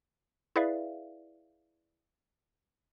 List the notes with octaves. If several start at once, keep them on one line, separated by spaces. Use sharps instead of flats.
E4 G#4 B4 D5 E5 F5